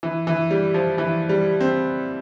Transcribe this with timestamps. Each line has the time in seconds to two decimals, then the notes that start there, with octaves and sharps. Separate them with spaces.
0.03 E3
0.27 E3
0.51 G3
0.74 F3
0.98 E3
1.29 G3
1.60 C4